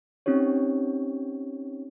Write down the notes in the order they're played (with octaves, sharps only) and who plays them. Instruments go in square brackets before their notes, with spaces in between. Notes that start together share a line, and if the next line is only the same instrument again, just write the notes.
[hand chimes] C4 C#4 D#4 G4 C#5